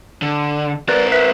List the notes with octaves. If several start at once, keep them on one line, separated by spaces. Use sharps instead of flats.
D3
C4 A#4 B4 D5
B4 E5